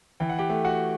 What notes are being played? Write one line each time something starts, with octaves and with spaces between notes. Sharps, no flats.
E3 G5
F#5
G4 G5
A3
F#4 F#5